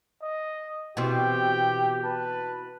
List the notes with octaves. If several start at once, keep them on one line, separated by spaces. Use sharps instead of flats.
D#5
B2 E3 C4 G4 G5
B4 A5